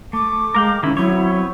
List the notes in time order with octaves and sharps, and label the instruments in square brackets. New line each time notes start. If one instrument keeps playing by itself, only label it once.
[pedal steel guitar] A3 [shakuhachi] D6
[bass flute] G#3 [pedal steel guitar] A#4 F5 G5
[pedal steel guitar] D#3 E4 [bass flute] C#4
[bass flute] F#3 [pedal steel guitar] B3 C4 C#5 [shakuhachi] E4